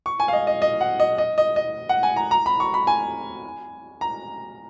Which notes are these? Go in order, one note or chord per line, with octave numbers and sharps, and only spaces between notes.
C#6
G#5
F5
D#5
D#5
D#5
F#5
D#5
D#5
D#5
D#5
F#5
G#5
A#5
A#5
B5
C#6
B5
G#5
A#5